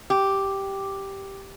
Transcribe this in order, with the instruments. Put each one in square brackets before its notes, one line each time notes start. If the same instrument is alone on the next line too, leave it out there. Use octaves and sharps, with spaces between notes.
[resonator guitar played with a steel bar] G4